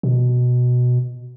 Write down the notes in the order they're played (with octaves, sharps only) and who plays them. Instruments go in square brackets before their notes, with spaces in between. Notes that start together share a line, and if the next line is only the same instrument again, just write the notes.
[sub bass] B2